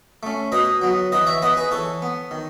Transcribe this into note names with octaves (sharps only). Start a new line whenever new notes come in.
A3 C#4
B2 B4 D#5
F#3 B3
E3 B4 D#5
C#5 E5
B3 B4 D#5
G#4 B4
E3 A4 C#5
B3
D#3